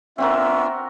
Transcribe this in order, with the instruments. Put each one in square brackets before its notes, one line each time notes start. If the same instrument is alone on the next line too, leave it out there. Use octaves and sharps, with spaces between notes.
[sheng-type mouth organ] B3 D4 F4 [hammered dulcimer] C4 F#4 A#4 [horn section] E5